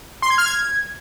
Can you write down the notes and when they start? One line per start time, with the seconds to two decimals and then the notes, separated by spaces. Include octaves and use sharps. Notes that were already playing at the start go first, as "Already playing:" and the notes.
0.22 C6
0.30 G#6
0.38 F6
0.46 G#6